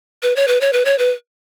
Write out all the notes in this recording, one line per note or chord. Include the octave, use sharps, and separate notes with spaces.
B4
C#5
B4
C#5
B4
C#5
B4